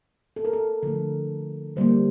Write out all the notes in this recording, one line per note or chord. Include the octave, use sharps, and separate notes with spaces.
A4
A#4
A4
D3 F3 A3 A4
D3 G3 A#3 C5